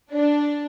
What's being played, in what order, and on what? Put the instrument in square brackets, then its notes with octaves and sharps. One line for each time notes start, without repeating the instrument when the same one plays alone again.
[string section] D4